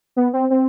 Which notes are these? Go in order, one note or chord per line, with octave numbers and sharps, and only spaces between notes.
B3
C4
C4